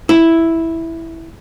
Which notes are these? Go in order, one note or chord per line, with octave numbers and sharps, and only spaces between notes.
E4